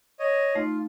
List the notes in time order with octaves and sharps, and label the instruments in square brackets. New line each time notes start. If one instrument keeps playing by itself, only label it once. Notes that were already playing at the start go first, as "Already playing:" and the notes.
[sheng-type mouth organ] C#5 D#5
[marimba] A3 D#4 [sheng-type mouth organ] F4